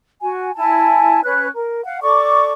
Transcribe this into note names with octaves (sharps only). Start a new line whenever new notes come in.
F#4 G#5
E4 G#5 A5
C#4 B4 F#6
A#4
F5 F#5
A4 D5 C#6 D6